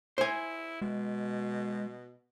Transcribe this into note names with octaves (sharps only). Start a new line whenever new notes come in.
E4 C5 G#5
B2 G#3